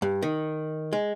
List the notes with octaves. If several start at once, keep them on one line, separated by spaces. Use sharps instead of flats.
G2
D#3
G#3